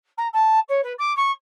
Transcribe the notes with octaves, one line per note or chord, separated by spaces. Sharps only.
A#5
A5
C#5
B4
D6
C#6